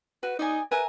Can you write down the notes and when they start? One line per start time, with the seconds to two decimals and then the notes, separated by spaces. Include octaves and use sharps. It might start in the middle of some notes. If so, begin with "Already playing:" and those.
0.23 F#4 B4
0.39 D#4 D5 D#5 G#5
0.71 A#4 B4 E5 G#5